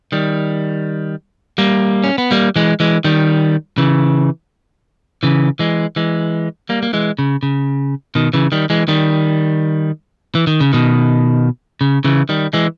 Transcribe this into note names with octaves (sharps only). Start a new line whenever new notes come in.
D#3 G3
G3 A#3
C#4
B3
G3 A#3
E3 G#3
E3 G#3
D#3 G3
C#3 E3
C#3 E3
E3 G#3
E3 G#3
G3 A#3
A#3
E3 G#3
C#3
C#3
B2 D#3
C#3 E3
D#3 G3
E3 G#3
D#3 G3
E3
D#3
C#3
B2 D#3
C#3
C#3 E3
D#3 G3
E3 G#3